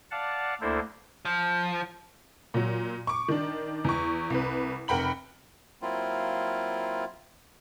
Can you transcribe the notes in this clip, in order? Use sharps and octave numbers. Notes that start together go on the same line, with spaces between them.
D5 F5 F#5 A5
D2 A#3 D4 E4 A4 C5
F3
A#2 F#3
C#6 D6
D#3 D4
E2 C#6
C2 B4
F1 A#4 F#5 G5 B5 F#7
F#3 A#3 C4 E4 F4